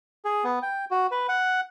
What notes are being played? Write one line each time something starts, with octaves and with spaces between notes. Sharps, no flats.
G#4
B3
G5
F#4
B4
F#5